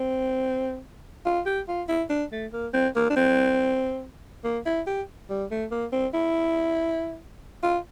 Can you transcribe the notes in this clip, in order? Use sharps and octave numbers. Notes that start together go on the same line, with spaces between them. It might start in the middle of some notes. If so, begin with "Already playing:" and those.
Already playing: C4
F4
G4
F4
E4
D4
A3
A#3
C4
A#3
D4
C4
A#3
E4
G4
G3
A3
A#3
C4
E4
F4